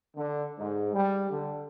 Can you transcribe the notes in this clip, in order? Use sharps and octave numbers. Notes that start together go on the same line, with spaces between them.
D3
G#2
G3
D3